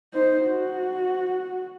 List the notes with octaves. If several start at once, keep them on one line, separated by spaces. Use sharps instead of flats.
D#4 C5
F#4